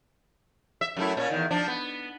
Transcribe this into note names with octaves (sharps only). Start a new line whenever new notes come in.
E5
F#2 A3 E4
A#2 C#4
E2 D#3
F3 D4
B3